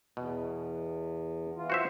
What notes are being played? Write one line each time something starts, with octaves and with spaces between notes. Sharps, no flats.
E2 B2
E3 F4
F#4 C5 E5